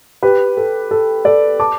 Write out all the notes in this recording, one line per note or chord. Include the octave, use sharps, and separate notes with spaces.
G4 B4
A4
A4
A4 D5
A5 D6